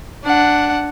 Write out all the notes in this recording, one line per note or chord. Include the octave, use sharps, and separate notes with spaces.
D4 F#5